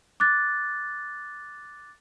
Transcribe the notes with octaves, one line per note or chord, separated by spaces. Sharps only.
D6 F#6 A6